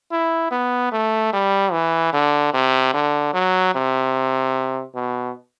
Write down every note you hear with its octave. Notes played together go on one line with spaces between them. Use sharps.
E4
B3
A3
G3
E3
D3
C3
D3
F#3
C3
B2